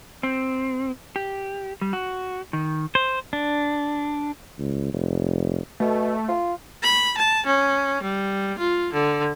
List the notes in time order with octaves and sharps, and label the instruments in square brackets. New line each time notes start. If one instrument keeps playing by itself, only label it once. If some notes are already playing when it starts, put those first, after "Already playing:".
[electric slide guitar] C4
G4
G3
F#4
D#3
[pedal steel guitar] C5
D4
[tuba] C#2
F1
[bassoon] B2 [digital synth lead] A3
[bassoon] F4
[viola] B5
A5
C#4
G3
F4
D3